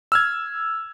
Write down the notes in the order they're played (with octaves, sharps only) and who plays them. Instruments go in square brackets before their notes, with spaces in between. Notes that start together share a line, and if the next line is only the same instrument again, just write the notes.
[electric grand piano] E6 F6 G#6